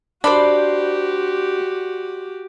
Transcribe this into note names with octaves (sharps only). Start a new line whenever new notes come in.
D4 F#4 G4 C5 D5 B5